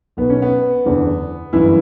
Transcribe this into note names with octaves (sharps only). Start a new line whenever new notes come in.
B1 B2 B3
C#4
B3
F#1 E2 D3
G1 F#2 E3 E4